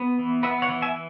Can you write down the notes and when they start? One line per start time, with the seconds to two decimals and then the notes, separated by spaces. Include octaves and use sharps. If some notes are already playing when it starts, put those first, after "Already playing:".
Already playing: B3
0.19 E3
0.43 B3 B4 E5
0.62 C#5 F#5
0.69 E3
0.82 E5 G#5